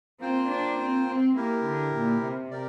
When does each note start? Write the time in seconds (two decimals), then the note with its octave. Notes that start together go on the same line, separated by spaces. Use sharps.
0.20 A#3 C4 F4 C5 G5
0.49 D4
0.78 C4
1.07 C4
1.35 A#3 E4 G4 A#4
1.64 D3
1.93 A#2
2.22 C3
2.51 G4 A#4 D5